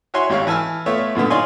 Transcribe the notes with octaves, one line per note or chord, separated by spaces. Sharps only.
E4 F#4 C#5 G#5 C6
G#1 G4 C#5 F5
E3 G#5 A5 E6 F6
A3 B3 F4 C#5 E5
F#2 A#2 D3 B3
D#4 F4 C#5 D5 G#5 C6